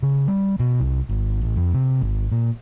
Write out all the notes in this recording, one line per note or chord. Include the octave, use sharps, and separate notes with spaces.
C#3
G3
B2
C2
G#1
A1
F2
C3
G#1
A#2